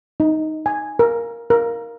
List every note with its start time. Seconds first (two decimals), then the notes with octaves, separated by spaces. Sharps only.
0.20 D#4
0.66 G#5
0.99 A#4
1.50 A#4